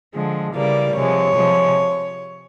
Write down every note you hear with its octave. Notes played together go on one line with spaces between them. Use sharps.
D3 F3 G#3
C#3 E3 G3 A#3 D5
C3 F3 G#3 C#5
C3 F3 G#3